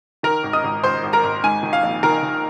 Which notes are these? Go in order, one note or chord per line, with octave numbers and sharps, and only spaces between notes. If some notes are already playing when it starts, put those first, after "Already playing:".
D#3 A#4 A#5
G#1
D#5 D#6
G#1
G#1 C5 C6
G#1
A#4 A#5
G#1
G#2 G#5
D#3
F5
A#1
D#3 A#4 A#5
D#3